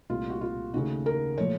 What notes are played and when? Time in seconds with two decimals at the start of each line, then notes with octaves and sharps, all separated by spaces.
0.09 C2 A#2 A3 F4
0.30 F#4
0.41 F4
0.74 D#2 C#3 A3 F#4
1.06 A#4
1.38 A#2 F3 A3 C#5